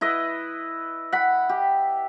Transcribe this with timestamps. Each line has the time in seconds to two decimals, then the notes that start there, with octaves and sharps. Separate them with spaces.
0.01 E4 B4 D#5
1.12 F#5 B5
1.49 G4